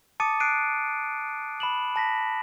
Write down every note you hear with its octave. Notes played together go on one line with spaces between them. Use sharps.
A5 D6 D#6 A6 C#7 D#7
F#6 C7 D7 D#7
B5 E7 F#7
A5 A#6 B6